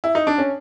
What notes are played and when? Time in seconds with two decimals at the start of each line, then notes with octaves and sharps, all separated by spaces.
0.04 E4
0.15 D#4
0.27 D4
0.38 C#4